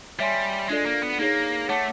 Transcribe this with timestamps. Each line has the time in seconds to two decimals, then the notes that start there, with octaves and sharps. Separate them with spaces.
0.19 G3 C#5 E5 G#5 C6
0.69 G#3 D4 F4 A4 D5
0.86 A#3
1.02 B3
1.19 A#3 D#4 G#4 C#5
1.69 A3 C#5 F#5 A5 D6